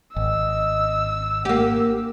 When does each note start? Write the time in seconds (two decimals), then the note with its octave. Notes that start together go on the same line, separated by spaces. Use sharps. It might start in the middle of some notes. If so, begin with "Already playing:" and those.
0.16 G#1 D#5 E6
1.45 A#3 G4 F#5